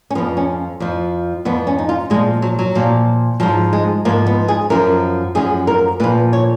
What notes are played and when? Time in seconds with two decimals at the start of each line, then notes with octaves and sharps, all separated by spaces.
0.10 C#4
0.15 F3 B3
0.18 F2
0.37 C#4
0.80 F2 F3
1.45 F2 F3 B3
1.67 C#4
1.78 D#4
1.89 F4
2.10 A#2 F3 G#3
2.42 F#3
2.59 F#3
2.75 A#2 F3
3.40 G#2 F3 F#3
3.73 G#3
4.05 G#2 F3 A#3
4.27 B3
4.48 G#4
4.70 F#2 F3 A#4
5.35 F#2 F3 G#4
5.67 A#4
6.00 A#2 F3 B4
6.33 C#5